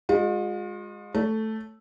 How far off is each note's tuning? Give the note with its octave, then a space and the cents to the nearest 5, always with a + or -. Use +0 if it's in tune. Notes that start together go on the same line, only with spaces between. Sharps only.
G#3 -15 F4 +40
A3 +0 C#5 +5